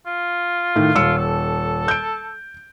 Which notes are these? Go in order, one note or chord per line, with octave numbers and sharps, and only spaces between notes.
F4
A2 D#3
D#1 E6 C#7
A4
G6 D7